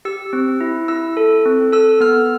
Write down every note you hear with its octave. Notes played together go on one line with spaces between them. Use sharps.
G4 E6
C4
E4
E4 E6
A4
C4
A4 E6
B3 F6